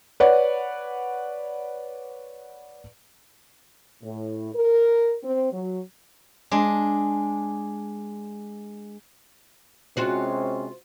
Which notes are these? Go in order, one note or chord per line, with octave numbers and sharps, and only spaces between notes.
B4 C#5 D5 F#5
A2
A#4
C4
F#3
G#3 D4
C3 G#3 C#4 F4 F#4 C5